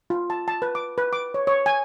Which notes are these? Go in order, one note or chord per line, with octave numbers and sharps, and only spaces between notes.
F4
A5
A5
B4
D6
B4
D6
C#5
C#5
G#5